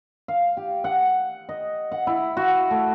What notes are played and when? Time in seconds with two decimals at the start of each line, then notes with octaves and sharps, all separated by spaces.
0.28 F5
0.57 G4
0.84 F#5
1.49 D#5
1.92 F#5
2.07 E4
2.37 F#4
2.71 A3